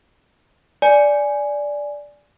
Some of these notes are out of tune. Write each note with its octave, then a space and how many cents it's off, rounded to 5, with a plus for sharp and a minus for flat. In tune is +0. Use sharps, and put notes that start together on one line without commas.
D5 -5 G#5 +0